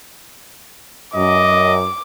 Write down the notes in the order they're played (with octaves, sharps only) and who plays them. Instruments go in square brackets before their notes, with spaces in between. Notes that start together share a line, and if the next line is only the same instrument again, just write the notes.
[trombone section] F#2 [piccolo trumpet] D#5 [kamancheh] D6